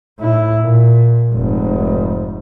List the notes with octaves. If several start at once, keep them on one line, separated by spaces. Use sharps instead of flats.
A2 E4
A#2
F1 G#2